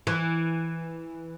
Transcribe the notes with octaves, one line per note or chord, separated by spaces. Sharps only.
E3